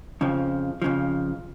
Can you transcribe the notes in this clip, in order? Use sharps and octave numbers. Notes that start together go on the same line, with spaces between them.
F2 C#3 F3
F2 C#3 F3